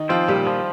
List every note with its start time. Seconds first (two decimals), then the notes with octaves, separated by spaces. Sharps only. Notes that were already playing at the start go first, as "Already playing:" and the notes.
Already playing: D#3 D#4
0.09 F3 C4 F4
0.28 A#2 G3 G4
0.47 F3